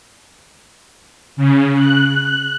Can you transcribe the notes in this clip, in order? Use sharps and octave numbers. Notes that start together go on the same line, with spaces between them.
C#3
F#6